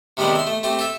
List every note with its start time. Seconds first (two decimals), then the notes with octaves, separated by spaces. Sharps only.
0.17 C3 D#3 G3 G#3 B3 C4
0.35 E5 C6
0.47 A3
0.63 A3 C4 G4
0.79 A4 E5